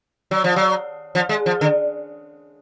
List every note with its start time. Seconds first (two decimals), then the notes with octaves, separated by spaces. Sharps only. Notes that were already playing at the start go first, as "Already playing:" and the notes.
0.31 F#3
0.44 F3
0.56 F#3
1.15 F3
1.29 G#3
1.46 F3
1.61 D3